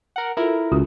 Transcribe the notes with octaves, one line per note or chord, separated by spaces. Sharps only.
A#4 F#5
E4 F4 A4 A#4
C#2 F4 F#4